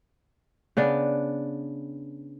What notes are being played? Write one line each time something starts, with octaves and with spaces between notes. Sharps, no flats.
C#3 B3 D4